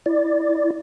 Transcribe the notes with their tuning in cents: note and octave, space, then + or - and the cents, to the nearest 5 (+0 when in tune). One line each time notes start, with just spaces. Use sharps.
E4 +0 D5 +0